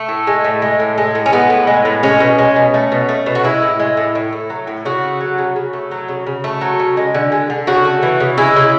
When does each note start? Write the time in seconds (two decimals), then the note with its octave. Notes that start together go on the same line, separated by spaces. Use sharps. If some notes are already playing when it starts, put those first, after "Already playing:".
Already playing: A3
0.09 A2
0.27 G#3
0.44 A2
0.62 G#3
0.80 A2
0.98 G#3
1.15 A2
1.26 C#4
1.32 G#3 B3
1.50 A2
1.67 G#3
1.85 A2
2.03 G#3 C#4
2.20 B2
2.39 G#3
2.56 B2
2.74 A3
2.92 B2
3.09 A3
3.26 B2
3.35 F#4
3.44 G#3 E4
3.62 A2
3.80 G#3
3.97 A2
4.15 A2
4.32 A3
4.50 F#3
4.67 A2
4.85 C#3 F#4
5.03 A3
5.21 F#3
5.38 C#3
5.56 C#3
5.73 A3
5.91 F#3
6.09 C#3
6.27 C#3
6.44 A3
6.61 F#3
6.79 C#3
6.97 G#3
7.14 D3
7.32 G#3
7.50 D3
7.67 C#3 F#4
7.85 A3
8.03 E3
8.20 C#3
8.38 G#3 E4
8.56 C#3